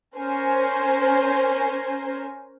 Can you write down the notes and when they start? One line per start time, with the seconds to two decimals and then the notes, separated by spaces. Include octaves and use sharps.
0.16 C#4 A#4 C5 G#5